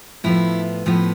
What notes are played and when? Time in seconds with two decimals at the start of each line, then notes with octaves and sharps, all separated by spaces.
0.24 A2 F3 B3 E4
0.86 A2 F3 B3